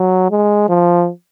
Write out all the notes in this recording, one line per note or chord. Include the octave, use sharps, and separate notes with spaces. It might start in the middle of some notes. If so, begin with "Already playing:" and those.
Already playing: F#3
G#3
F3